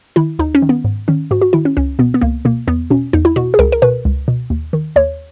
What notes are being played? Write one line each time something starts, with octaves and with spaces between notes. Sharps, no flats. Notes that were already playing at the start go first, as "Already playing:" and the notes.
D#3 E4
D#2 D#4
C#4
D#3
B3
G#2
D#3 C#4
G#2 F#4
F#4
D#3 E4
C#4
C#2 C#4
B2 B3
B3
C#2 A#3
B2 A#3
E2 B3
B2 C#4
E2 D#4
E4
B2 F#4
G#4
C#2 A#4
A#4
B2 B4
C#2
B2
D#2
D#3
D#2 C#5